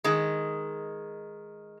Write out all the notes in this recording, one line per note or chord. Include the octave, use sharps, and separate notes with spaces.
D#3 G#3